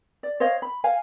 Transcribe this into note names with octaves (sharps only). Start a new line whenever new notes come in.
D5
C5 C#5 D#5 F5
B5
F5 G#5